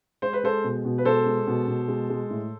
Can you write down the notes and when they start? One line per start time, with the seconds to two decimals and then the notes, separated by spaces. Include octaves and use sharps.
0.22 G#3 C5
0.33 B4
0.43 G#3 A4 C5
0.64 B2
0.85 B2
0.98 B4
1.05 G#3 A4 C5
1.26 G#3
1.47 B2
1.68 B2
1.88 G#3
2.10 G#3
2.30 A2